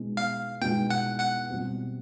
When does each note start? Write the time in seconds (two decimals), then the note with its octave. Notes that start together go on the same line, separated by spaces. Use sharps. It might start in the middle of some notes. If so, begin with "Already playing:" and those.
Already playing: B2 G#3 B3 D#4
0.17 F5
0.61 B2 G#3 B3 D#4 G5
0.90 F#5
1.20 F#5
1.49 B2 G3 C4